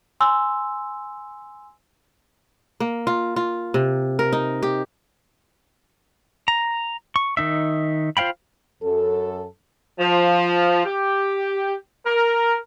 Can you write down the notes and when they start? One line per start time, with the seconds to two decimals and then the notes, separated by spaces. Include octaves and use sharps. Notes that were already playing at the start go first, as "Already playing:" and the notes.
0.20 G#5 C6 E6
2.80 A#3
3.07 F4
3.36 F4
3.74 C3
4.19 A#4
4.33 D#4
4.63 G4
6.48 A#5
7.16 C#6
7.37 D#3 D#4 E5
8.17 F4 C5 F5 G5 B5
8.83 F#2 A4
9.99 F3
10.84 G4
12.06 A#4